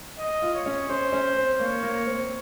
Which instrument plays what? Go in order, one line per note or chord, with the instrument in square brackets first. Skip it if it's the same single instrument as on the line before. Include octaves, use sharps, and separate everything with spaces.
[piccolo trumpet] D#5
[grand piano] F4
[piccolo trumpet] C#5
[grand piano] C#4
[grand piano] C#4 [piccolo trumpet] C5
[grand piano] C#4
C4
[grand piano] A#3 [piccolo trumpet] C#5
[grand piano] A#3
C4